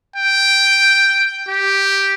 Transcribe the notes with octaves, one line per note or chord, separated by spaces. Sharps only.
G5
G4